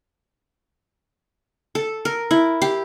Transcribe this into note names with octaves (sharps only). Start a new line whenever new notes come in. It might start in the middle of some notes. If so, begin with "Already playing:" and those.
A4
A#4
E4
G4